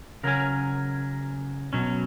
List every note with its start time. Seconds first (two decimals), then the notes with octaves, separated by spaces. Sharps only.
0.23 C#3 F#3 C#4 A#4
1.73 B2 F#3 C#4